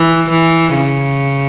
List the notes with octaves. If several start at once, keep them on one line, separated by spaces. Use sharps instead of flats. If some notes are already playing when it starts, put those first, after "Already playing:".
Already playing: E3
E3
C#3